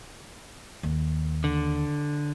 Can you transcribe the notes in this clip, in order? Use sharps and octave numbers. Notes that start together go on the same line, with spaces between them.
D#2
D3